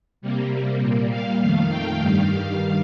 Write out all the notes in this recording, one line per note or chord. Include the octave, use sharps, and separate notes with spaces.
C3 G3 A#3
A#2 G3 A#3
F5
F2 D#3 A3
G5
G2 D#3 G3 F5